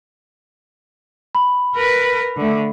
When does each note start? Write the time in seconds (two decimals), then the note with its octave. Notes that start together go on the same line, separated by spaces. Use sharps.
1.35 B5
1.75 A#4 B4
2.37 D3 A3